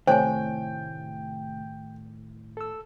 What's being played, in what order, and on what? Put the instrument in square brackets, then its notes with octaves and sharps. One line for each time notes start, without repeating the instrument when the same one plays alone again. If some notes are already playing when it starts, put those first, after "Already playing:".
[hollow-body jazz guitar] A2 D#3 [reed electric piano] C3 A3 [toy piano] C5 C#5 G#5 [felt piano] G5
[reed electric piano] A4 E6